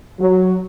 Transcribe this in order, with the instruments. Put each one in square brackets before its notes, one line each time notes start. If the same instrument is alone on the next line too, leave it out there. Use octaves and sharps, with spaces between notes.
[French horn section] F#3